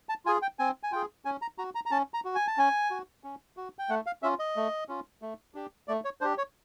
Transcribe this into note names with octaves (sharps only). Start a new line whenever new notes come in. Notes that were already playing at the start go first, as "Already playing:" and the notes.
A5
F4 G#4 G#5
G5
C4 G#5
G#5
F4 G#4 G5
C#4 G#5
A#5
F#4 A#5
A#5
A#5
C#4 A5
A#5
F#4
G#5
A5
C#4 G#5
F#4
C#4
F#4
G5
A3 F#5
F5
C#4 F4 E5
D#5
A3
C#4 F4
A3
D4 G4
A3 D5
C#5
D4 G4 C5
C#5